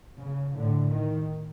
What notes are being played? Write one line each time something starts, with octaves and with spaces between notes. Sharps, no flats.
C#3
A2 D3
D#3